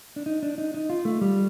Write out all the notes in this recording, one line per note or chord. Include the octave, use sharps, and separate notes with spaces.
D4
D#4
D4
D#4
D#4
F4
A3
G3